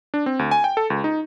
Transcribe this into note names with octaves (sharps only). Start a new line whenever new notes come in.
D4
C4
D2
G#5
G5
A4
C#2
D#4